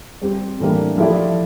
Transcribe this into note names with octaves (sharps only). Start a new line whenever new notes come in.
G3 C4 G4
A2 E3 G3 A#3 D4
F3 A3 E4 G4 D5